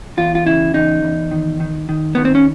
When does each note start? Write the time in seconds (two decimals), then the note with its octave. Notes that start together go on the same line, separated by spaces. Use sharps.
0.17 E2 F4
0.35 F4
0.46 C#3 E4
0.74 E2 D#4
1.03 E2
1.31 D#3
1.60 D#3
1.89 D#3
2.15 D#3 B3
2.25 C4
2.35 C#4